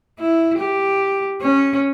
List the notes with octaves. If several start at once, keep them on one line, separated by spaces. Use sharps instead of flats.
E4
G4
C#4